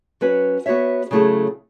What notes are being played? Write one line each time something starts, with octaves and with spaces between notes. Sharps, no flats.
F#3 C#4 F#4 B4
B3 F#4 C#5 E5
C#3 F#3 A3 E4 G#4